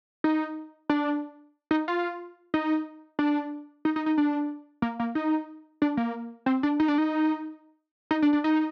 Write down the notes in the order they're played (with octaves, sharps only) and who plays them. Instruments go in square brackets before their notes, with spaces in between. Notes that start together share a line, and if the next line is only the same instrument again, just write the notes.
[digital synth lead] D#4
D4
D#4
F4
D#4
D4
D#4
D#4
D#4
D4
A#3
A#3
D#4
D4
A#3
C4
D4
D#4
D4
D#4
D#4
D4
D4
D#4